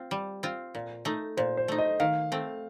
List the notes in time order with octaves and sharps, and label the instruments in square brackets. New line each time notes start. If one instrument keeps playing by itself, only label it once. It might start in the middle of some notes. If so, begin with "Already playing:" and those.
Already playing: [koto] C4 F4
G3
C4 F4
A#2
A3 D#4
[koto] A#2 [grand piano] C5
[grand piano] C5
[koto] A3 D#4
[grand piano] D#5
[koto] D#3 [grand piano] F5
[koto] A3 C4